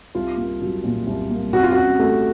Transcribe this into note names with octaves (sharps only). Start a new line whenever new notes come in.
C2 F4
A#3
F#3
A#2
C2
A#3
C3 F#4
F4
C#4 F#4
A3